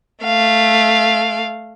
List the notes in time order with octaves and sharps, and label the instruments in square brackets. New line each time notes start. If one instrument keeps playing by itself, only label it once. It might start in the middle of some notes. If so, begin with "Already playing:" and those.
[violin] A3 F5